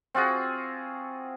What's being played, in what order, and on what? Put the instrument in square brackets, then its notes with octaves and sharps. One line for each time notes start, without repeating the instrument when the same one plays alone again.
[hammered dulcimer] C4 F4 F#4 G#4